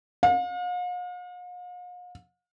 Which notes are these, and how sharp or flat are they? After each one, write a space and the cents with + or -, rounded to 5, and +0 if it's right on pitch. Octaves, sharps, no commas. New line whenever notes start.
F5 +45